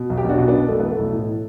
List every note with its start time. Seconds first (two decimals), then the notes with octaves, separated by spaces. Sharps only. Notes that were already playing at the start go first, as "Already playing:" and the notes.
Already playing: B2
0.10 B1
0.18 G4
0.24 B1 D4 F#4
0.38 B2
0.48 B3 D4
0.54 B2
0.68 B1 A3
0.80 E3 B3
0.92 A3
0.98 B1
1.13 A2